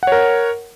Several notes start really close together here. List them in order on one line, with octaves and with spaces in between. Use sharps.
F#5 C#5 A#4